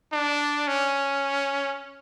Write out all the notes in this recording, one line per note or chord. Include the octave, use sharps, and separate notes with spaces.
D4
C#4